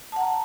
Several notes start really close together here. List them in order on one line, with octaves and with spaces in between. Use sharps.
A5 F#5 A#5